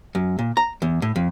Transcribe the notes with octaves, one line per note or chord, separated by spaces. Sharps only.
F#2
A#2
A#5
E2
A2
F2